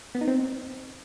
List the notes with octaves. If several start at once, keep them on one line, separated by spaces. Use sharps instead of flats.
B3
D#4
C4